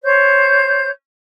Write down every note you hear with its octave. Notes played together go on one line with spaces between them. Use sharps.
C5 C#5 G6